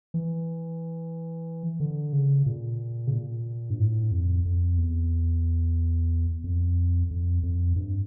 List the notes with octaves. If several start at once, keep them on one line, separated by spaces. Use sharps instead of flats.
E3
D3
C#3
A#2
C#3
A#2
G2
A2
F2
F2
E2
F2
F2
F2
G2